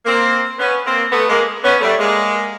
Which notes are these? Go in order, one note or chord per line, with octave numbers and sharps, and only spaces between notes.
A#3 C4
B3 C#4
A#3 C4
A3 B3
G#3 A#3
B3 C#4
G3 A3
G#3 A#3